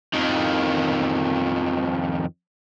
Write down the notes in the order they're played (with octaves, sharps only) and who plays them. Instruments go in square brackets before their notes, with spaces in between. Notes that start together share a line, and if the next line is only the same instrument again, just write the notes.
[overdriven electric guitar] F2 D#3